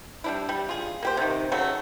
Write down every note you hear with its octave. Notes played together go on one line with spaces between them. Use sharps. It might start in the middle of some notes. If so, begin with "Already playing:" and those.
G3 D4 E4
G3
F4 G#4
A#3 G4 C5
C3 D#3
C#3 F#3 A3